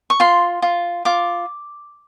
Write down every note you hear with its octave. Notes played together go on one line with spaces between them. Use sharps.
C#6
F4 C6
F4
F4 D6